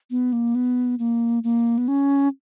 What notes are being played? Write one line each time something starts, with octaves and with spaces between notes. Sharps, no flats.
B3
A#3
B3
A#3
A#3
B3
C#4